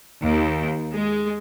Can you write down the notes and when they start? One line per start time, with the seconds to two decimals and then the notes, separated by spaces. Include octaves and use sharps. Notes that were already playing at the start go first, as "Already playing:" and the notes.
0.22 D#2
0.93 G#3